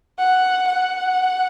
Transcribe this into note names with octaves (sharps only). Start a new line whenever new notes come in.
F#5
F#5